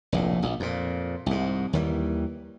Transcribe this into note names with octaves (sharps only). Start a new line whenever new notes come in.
F1 A#1 A2
A#1
F2 A#2
C2 G#2
D#2 D#3 E3 G3